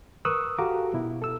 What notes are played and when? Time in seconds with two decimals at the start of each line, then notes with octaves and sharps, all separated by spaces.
0.25 A#4 B4 C#6 D#6 E6 F#6
0.58 F#4 G4 A4 F5 A#5 D6
0.94 B2 E4
1.22 A4 E6